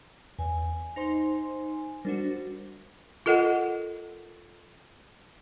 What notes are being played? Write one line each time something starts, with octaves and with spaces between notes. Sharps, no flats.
E2 G#5
D#4 C5 C6
G3 D4 F#4 A#4 C5
F4 A4 A#4 D#5 F#5